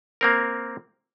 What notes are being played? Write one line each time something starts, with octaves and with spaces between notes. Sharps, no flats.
A#3 C4 A#4